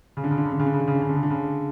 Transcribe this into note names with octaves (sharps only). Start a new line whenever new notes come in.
C#3
D3
C#3
D3
C#3
D3
C#3
D3
C#3
D3
C#3
D3
C#3
D3
C#3
D3
C#3